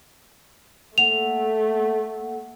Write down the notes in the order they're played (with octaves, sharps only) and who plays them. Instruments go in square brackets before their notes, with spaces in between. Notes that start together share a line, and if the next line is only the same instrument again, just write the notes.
[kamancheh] A3 [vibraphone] A#3 A4 F#5 [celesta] F7